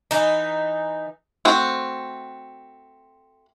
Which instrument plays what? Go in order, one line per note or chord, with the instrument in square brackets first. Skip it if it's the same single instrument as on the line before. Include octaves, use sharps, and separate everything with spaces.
[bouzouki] E3 D#4
[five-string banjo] A3 C4 F#4